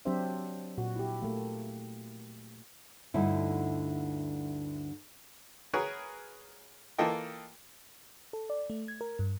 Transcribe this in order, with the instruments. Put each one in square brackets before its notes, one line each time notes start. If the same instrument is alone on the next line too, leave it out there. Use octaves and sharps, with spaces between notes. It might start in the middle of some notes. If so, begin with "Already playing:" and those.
[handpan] F#3 C4 D4 G4 C5 E5
A#2 F#4
E4 G4
A3 A#3
[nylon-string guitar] D2 G2 D3 D#4 E4
[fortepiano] F#4 G#4 A#4 B4 C#5
E3 A#3 F4 A4 D#5 G5
[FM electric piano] A4
D5
A3
G#6
A#4
G2